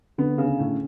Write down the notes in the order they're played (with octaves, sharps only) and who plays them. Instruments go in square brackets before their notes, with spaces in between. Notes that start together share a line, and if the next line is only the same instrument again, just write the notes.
[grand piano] D3 [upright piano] B3
[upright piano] C#3
[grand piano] C#4
[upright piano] A2